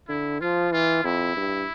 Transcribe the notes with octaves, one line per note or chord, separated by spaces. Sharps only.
D3 E4
F3 F4
E3 F4
F2 E4
G2